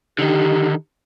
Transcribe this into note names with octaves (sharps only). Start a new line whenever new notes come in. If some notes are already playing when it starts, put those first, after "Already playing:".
D3 D#3 D#4 G4